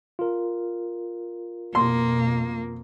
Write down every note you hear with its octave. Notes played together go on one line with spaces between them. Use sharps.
F4 A#4
F2 B2 A#3 C6